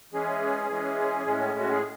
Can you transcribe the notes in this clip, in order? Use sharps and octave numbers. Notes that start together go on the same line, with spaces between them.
E3 G#3 C#4 G#4
E3 G#3 C#4
A2 G#3 C#4
F#4
G#4